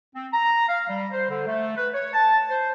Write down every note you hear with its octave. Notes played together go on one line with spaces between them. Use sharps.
C4
A#5
F5
G3
C5
D3
A3
B4
C#5
A5
C5